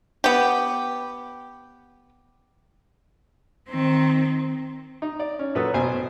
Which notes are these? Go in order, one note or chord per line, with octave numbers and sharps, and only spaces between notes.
B3 G4
D#3 C4
D#4
D5
C#4
A#2 F#3 A4 B4 C#5 D#6
A1 B2 C5 G#5